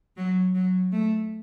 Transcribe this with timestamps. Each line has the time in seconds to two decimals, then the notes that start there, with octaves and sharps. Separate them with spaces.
0.16 F#3
0.54 F#3
0.91 A3